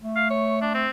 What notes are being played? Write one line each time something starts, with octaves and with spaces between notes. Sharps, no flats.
A3
F5
C#5
D4
C4